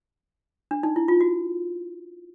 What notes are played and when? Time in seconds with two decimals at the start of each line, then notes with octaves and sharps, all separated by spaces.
0.71 D4
0.83 D#4
0.96 E4
1.08 F4
1.21 F#4